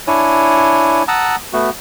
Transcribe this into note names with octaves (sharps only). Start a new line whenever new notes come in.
D4 E4 C#5 G#5
F#5 A5 A#5 D#6 E6
A3 B3 F#4